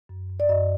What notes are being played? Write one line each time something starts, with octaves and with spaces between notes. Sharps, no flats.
F#2
F#2
D5
F#2 D#5